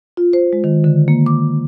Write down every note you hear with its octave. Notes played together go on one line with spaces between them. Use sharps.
F4
C5
G#3
D#3
D3
A#3
D6